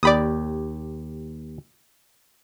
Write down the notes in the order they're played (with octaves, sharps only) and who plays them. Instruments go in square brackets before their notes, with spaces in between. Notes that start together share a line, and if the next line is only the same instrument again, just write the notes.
[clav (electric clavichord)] D#2 G4 [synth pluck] D5 B5 D#6